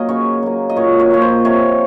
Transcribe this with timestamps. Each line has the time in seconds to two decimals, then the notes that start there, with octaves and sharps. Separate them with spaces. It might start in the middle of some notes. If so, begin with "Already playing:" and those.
Already playing: F#3 A#3 G#4 A#4 D#5
0.09 C#3 C#5
0.43 F#3 A#3
0.70 D#5
0.76 A#2 C#5
0.99 C#5
1.11 F3 A#3 C#5
1.22 C5
1.45 C3 C#5